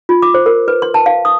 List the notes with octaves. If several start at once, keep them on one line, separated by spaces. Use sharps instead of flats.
F4
D6
C5
A#4
B4
C6
A5
F5
D#6